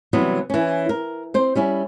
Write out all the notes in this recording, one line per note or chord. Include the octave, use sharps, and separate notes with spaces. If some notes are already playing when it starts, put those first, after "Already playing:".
C3 E3 F#3 G3 B3
E3 C#4
A#4
C4 C5
G3 C#4 E4